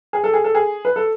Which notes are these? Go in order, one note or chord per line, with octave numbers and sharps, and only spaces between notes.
G#4
A4
G#4
A4
G#4
B4
A4